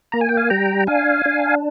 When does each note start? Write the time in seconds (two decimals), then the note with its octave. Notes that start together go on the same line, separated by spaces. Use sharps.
0.12 A#3 A#5
0.21 G#5
0.29 G5
0.37 F5 G#5
0.50 G3 G5 A#5
0.87 D4 F5 G#5
1.26 D4